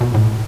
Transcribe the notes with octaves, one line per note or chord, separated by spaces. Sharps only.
B2
A2